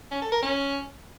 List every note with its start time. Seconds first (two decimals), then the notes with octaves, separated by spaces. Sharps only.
0.11 C#4
0.22 A4
0.32 A#4
0.42 C#4